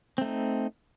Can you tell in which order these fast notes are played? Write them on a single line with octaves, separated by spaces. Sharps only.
C4 A3 D#4